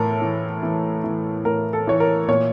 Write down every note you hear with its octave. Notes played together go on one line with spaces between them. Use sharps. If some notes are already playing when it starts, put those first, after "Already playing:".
Already playing: A2 E3 A4 A#4
E3
E3
E3
A2 A#4
A4
E3 C#5
A#4
A#2 C#5